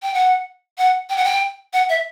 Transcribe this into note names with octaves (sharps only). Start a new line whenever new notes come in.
G5
F#5
F#5
G5
F#5
G5
F#5
E5